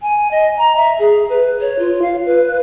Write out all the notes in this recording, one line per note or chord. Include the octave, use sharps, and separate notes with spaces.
G#5
D#5
A#5
E5
G#4
B4
C#5
F4
F5
B4